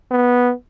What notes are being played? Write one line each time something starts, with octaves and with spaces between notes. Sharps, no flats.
B3